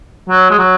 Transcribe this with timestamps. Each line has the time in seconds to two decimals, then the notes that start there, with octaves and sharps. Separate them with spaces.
0.29 F#3
0.51 G#3
0.58 F#3